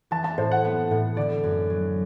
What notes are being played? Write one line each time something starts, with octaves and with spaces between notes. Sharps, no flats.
E3 A5
A5
A2 C5
F#5
B3
A2
D3 D5
F#2
F#3